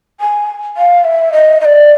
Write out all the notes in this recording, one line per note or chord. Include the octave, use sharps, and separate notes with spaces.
G#5
F5
E5
D#5
D#5
D5